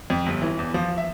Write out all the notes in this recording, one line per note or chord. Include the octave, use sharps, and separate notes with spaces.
F2
G1
E3
E2
F3
E5